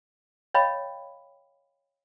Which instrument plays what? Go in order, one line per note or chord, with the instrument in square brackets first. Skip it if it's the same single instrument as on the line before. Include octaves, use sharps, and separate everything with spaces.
[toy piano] C#5 D#5 F5 G5 B5